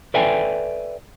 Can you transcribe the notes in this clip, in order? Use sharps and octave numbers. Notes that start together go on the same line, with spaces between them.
A4 B4 D5 E5 G5 G#5